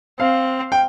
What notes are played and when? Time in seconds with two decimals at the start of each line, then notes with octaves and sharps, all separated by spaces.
0.20 C4 F5
0.72 G5